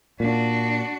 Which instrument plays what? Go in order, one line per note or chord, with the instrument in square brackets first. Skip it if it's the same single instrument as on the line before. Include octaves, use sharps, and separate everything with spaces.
[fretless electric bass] A#2 [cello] D4 F#4